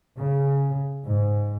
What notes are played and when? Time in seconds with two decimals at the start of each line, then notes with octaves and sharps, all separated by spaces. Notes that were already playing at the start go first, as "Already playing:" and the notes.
0.18 C#3
1.04 G#2